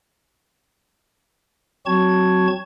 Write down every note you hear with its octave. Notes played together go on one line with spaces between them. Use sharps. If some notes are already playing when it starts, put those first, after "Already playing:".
F#3 C4 F#4 A5 C#6 G#6